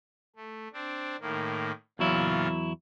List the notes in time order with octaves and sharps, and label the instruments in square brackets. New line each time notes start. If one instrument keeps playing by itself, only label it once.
[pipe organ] A3
C4 D4
A2 D#3 A#3
[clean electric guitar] E2 F#3 E4 [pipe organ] A#2 C#3 F4